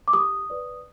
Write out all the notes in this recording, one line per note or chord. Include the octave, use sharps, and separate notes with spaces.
D6
G4 D#6
B4 D5